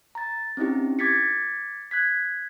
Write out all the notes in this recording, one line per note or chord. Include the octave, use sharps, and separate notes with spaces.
A#5 A6
C4 C#4 D#4 E4 G4
D6 G#6 A6 B6 C#7
F#6 G#6 B6